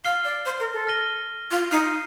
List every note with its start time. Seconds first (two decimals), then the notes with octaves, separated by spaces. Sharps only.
0.05 F5 F6 C7 G7
0.25 D5
0.45 C5
0.60 A#4
0.73 A4
0.87 F6 A#6 D#7 G7
1.51 F4
1.71 D#4 F6 C7 D#7